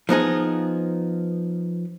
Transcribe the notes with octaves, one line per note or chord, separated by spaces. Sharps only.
F3 B3 D#4 G#4